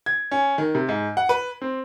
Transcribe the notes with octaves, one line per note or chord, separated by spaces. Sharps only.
G#6
C#4
D#3
C3
G#2
F#5
B4
C4